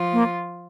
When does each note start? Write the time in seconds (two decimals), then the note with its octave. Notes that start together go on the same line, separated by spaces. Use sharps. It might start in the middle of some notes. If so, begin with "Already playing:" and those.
Already playing: F3 F4
0.13 A#3